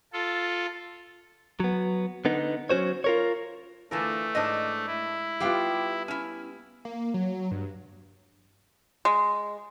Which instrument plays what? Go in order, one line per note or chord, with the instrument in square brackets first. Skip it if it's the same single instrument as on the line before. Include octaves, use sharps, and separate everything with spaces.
[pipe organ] F4 A4
[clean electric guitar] F#3 B3
D3 B3 D#4
F#3 C#4 F#4 C5 C#5
F4 A#4 C#5
[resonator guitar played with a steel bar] D3 F4 A#4 [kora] E3 A4 D5 [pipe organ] A3
[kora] G#2 [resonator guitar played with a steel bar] D4 C5 D#5
[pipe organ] E4
[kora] G3 B3 F4 [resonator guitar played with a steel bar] G4 F5 G5
[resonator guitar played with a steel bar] C#4 E4
[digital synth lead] A#3
F#3
G2
[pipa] G#3